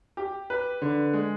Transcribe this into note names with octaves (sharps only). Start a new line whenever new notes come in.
G4
B4
D3
G#3